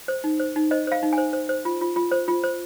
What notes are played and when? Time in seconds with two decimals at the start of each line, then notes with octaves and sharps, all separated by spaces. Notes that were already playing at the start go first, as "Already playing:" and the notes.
0.08 C5
0.24 D#4
0.40 C5
0.56 D#4
0.71 C5 D#5
0.87 C5 F5
1.03 D#4
1.13 G#5
1.18 C5
1.33 C5
1.49 C5
1.65 F4
1.81 F4
1.96 F4
2.11 C5
2.28 F4
2.44 C5